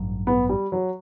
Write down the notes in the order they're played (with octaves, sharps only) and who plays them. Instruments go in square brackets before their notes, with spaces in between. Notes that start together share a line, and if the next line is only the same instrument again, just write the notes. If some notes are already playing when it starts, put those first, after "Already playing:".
Already playing: [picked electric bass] A1 G2 F#3
[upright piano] B3
G3
F#3